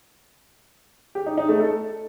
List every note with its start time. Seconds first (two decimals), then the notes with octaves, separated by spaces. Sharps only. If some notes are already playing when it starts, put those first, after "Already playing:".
1.15 G4
1.26 D#4
1.38 D#4
1.49 A3
1.60 A4